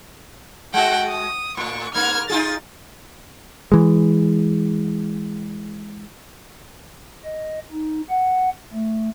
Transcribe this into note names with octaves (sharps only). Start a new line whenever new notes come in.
G#3 F#4 F#5 G5
D#6
A2 C#6
G#2 A#3 F6 G#6
D#4 F4 G#4 A6
E3 G#3
D#5
D#4
F#5
A3